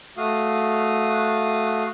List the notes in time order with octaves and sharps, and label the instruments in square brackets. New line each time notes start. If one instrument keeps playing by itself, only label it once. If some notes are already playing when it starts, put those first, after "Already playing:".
[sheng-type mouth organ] A3 F#4 F5 D#6